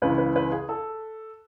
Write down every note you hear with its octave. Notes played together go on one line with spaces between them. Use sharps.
C#2 C#3 E3 B4
B4
B4
G#4
A4